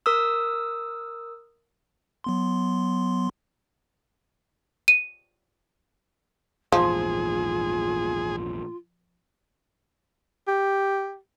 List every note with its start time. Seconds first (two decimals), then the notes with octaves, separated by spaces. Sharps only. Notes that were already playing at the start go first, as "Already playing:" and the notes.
0.06 A#4 D#6 E6
2.24 F#3 B3 C6
4.88 D#7
6.72 A#1 E2 G#2 F3 F4 G#4
10.48 G4